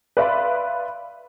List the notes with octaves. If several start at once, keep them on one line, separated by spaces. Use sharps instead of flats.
B4 D5 E5 F5 B5 C6